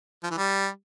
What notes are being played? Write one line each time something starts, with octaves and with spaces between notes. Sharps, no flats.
F3
E3
G3